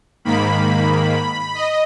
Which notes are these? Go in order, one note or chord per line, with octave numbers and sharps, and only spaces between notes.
G#2 D#3 A#3 B5
D#5